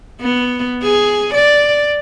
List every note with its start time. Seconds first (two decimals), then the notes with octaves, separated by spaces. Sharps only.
0.21 B3
0.83 G#4
1.34 D5